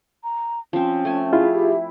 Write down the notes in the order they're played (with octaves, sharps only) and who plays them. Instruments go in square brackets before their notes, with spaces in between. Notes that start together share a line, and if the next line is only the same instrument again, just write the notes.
[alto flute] A#5
[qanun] F3 C4 [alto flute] C#4
[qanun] A3 G#5
[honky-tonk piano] E4 [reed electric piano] F4 G#4
[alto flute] G4